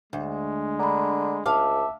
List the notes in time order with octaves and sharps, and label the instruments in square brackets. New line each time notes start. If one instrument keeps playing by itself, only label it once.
[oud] D2 [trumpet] G#3
[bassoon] D3 [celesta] A#5 B5
[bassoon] C#2 [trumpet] E5 [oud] F5 [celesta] A5 D6